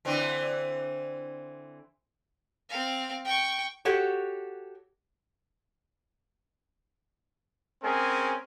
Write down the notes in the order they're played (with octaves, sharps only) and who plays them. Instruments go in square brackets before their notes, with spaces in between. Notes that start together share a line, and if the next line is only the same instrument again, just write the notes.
[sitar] D3 E3 C4
[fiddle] C4 F5
G5 C#6
[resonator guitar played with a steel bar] F#4 G4 A4 C#5 F#5
[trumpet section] G#3 C4 C#4 G#4 A#4